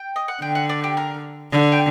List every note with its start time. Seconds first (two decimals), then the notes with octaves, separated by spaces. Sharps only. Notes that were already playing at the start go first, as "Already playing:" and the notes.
Already playing: G5
0.16 D#5
0.28 F#5
0.42 D3 G5
0.55 F#5
0.69 D5
0.84 G4
0.97 A#4
1.52 D3
1.72 G5